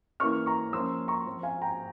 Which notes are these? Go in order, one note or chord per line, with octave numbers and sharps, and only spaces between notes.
E3 A#3 C#4 C#6 F6
A#5 C#6
F3 A#3 C#4 C6 E6
A#5 C#6
F3 C4
F5 G#5
G5 A#5